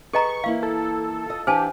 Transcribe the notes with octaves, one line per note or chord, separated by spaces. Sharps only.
G#4 A4 B4 D#5 A#5 C#6
E3 A#3 E4 F5
A4
F4 D#5
E3 D4 G4 C5 F5 G#5 A5